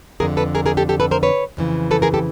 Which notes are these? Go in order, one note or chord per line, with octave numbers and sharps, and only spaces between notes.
F2 D3 G#4 A#4
A4 B4
G#4 A#4
G#4 A#4
G4 A4
G4 A4
A4 B4
A#4 C5
B4 C#5
F2 C#3 E3
A4 B4
G#4 A#4
G4 A4